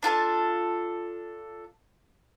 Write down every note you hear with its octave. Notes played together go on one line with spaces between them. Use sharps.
D4 F4 A4 A5